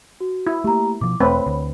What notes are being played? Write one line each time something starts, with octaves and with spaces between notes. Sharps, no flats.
F#4
E4
A3 A#3 G4 A#5
B2 F3 D6
E1 A3 C4 B4 C#5 B5
D2